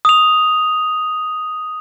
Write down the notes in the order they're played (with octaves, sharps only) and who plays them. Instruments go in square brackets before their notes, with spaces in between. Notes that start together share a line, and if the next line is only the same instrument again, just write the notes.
[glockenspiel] D#6 F7